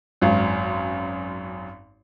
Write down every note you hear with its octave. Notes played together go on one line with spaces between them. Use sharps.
G#1 F#2